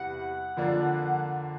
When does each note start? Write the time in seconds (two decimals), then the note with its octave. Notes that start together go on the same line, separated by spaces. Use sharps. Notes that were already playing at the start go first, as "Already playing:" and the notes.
Already playing: E2 C3 E3 G3 F#5
0.57 F2 D3 F3 A#3 D4